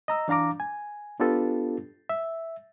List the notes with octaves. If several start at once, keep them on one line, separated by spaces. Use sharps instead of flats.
D#5 A#5 E6
E3 D4 F5 A#5 D6
G#5
B3 D4 F4 G4 A4 B4
E5